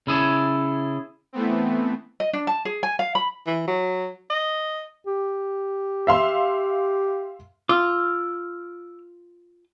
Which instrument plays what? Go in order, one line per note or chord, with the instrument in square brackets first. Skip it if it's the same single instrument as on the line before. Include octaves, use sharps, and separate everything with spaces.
[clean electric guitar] C#3 E4 G#4 A4
[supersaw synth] E3 A3 B3 C4
[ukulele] D#5
D4
A5
G#4
G#5
F5
B5
[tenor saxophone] E3
F#3
D#5
[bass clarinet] G4
[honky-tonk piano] E5 F5 C6
[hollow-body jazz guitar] F4 [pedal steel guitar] D6 E6 F6